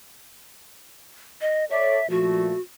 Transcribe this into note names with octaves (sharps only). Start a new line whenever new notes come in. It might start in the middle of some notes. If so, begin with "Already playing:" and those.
D#5
A4 C#5 D5 E5
A#2 F3 A3 F#4